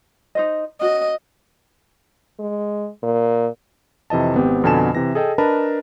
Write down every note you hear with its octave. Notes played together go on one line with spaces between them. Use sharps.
D#4 C5 D#5
C#4 F#4 D#5
G#3
A#2
F2 C3 E3 D#5 A5
G#1 B3 C4 G4
F2 B2 D3 G#5 A5 E7
C3 E3 A#6
G#4 A4 D#5 G5 A5
D4 A#4 B4 D#5 A5 B5